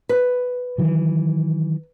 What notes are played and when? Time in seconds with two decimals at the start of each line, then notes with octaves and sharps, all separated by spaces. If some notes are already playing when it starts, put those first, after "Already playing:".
0.09 B4
0.78 D#3 E3 F#3